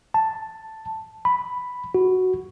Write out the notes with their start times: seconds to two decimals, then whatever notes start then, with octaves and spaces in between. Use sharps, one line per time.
0.14 A5
1.25 B5
1.95 F#4